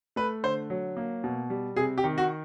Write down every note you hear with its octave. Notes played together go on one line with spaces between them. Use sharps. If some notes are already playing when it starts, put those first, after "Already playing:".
A3 B4
D3 C5
F#3
A#3
B2
G3
C3 G#4
G4
D#3
F#4